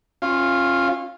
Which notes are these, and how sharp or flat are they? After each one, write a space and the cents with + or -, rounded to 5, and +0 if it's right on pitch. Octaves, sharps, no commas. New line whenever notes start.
C#4 -30 F4 +0